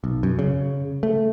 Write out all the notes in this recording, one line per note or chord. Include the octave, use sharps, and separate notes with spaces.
B1
F#2
C#3
A3